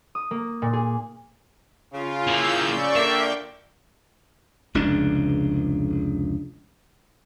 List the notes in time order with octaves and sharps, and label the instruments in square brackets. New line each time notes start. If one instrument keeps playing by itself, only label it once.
[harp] D#6
A#3
A#2
G#4
[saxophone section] C#3 [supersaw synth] F4
[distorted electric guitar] A#3 E4 [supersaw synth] E6 G6
[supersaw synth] D5 C#6
[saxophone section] D3 A#3 [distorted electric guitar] E5 [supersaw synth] G5
[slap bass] F1 C#2 C#3 D4